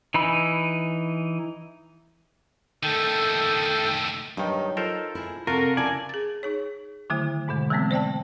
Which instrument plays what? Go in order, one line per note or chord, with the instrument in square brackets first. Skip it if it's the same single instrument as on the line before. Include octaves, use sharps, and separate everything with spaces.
[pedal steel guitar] E3 D#4 G#5 B5 E6
[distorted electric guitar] D#3 A3 [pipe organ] A4 G5
[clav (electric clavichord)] G2 D#3 [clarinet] F#3 [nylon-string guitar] D#4 G5
[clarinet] F4 [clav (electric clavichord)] A4 A#4 C5
[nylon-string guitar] E4 G#4
[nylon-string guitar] C3 A4 [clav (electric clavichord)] F4 F#4 [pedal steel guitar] A#4
[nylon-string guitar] C#3 E4 [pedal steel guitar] D5 G#5 [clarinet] A5
[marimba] G#4 A6
D#4 G#4 C#5
D3 D#3 F#3 A3 E4
G#2 B2 D3 G#3
E3 F#3 G#3 A3 B3 C4
C5 D5 G5 A5